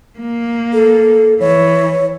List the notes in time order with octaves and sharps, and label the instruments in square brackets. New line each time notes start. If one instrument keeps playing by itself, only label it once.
[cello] A#3
[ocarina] A4
[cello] E3 [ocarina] C#5